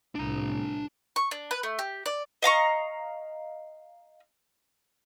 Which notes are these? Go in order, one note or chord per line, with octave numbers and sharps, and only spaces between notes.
C2 A2 D4 A#5
C#6
D4
B4
A3
G4
D5
D#5 F5 A#5 C#6